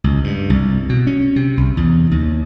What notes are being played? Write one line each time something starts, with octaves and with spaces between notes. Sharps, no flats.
C#2
G2
C2
B2
C#4
C3
C2
E2
D#2